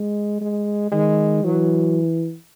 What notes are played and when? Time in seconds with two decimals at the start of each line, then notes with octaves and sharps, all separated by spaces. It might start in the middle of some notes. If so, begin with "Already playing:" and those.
Already playing: G#3
0.41 G#3
0.92 D#3 G#3
1.44 E3 F#3